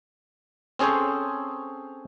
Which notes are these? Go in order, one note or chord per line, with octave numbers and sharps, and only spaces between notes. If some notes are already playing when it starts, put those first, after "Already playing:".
C4 C#4 G#4 A4 C5 C#5